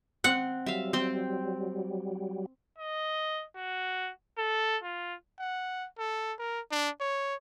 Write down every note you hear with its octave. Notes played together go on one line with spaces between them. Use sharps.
C4 F#5
F#3 G3 E5 F5
C4 C5 G5
D#5
F#4
A4
F4
F#5
A4
A#4
D4
C#5